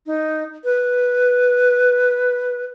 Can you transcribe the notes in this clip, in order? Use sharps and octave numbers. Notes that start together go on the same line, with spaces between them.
D#4
B4